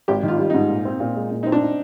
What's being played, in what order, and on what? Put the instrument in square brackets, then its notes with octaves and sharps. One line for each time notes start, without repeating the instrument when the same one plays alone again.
[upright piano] G#1 [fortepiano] G4
[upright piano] D#3 [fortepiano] F4
[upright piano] G3
[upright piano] G#2 [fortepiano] D#4
[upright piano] A#2
C4
A#2
G#3
A#2
[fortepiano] D#4
[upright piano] C4
[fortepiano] D4
[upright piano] D#4